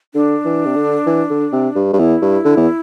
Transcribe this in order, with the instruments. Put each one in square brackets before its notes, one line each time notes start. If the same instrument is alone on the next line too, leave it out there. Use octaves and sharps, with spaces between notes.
[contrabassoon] D3 [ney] D4
[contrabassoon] E3
C3
D3
E3
D3
C3
G2
[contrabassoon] G2 [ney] D4
[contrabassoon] E2 [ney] E4
[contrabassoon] G2
D3
E2